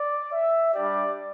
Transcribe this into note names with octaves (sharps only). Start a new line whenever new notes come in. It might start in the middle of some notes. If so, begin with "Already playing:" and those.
Already playing: D5
E5
G3 D4 G4 D5